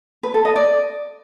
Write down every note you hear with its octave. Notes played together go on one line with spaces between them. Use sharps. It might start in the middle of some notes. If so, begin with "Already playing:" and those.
B4
A4
D#5
D5